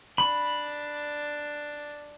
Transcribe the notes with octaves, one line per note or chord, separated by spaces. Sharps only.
D4 B5